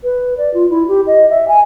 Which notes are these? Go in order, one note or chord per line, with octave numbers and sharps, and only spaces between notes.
B4
D5
F4
E4
G4
D#5
E5
G#5